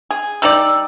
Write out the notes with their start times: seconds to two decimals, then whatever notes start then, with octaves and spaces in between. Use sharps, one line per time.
0.10 G#4
0.42 G3 D#4 D5 E6